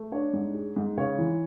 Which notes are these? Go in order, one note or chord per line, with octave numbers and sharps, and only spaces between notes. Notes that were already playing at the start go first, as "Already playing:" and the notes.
Already playing: A3
D4 C#5
G#2
G#3
G#2
C#3 C#5
E3